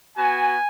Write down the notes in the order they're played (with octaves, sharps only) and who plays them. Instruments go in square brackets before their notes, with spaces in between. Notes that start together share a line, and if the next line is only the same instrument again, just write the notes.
[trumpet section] B3 F#4 G#5